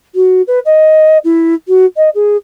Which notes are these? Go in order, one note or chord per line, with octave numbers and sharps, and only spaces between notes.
F#4
B4
D#5
E4
F#4
D#5
G#4